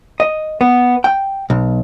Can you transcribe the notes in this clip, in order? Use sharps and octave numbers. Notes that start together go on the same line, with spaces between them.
D#5
B3
G5
B1